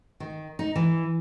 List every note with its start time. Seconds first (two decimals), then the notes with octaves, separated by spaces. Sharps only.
0.20 D#3
0.59 D#4
0.76 E3